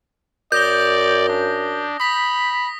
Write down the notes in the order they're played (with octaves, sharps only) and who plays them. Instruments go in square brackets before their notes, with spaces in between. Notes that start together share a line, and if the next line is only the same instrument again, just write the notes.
[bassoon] F#2 [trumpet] D5 [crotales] D#6 A#6 G7 [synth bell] G6
[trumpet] D4
[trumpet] B5 [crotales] D#6 B6